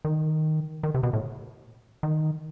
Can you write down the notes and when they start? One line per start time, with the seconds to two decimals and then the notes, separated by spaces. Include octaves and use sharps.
0.05 D#3
0.83 D#3
0.95 C3
1.03 B2
1.13 A2
2.03 D#3